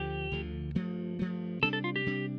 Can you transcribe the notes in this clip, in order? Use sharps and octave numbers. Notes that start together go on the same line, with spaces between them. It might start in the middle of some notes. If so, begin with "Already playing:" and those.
Already playing: D2 D3 F3 G4
D2 D3 F3
G2 F3 A3
G2 F3 A3
C3 G3 D4 A4
A4
F4
G4
C3 G3 D4